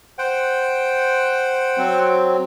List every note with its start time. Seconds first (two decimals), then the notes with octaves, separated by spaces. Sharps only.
0.18 C5 F#5 G5
1.78 F#3 C4